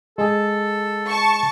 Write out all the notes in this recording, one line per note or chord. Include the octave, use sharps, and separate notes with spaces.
G#3 G#4 A4
A5 C#6